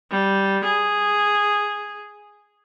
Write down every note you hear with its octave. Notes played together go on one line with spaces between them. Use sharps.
G3
G#4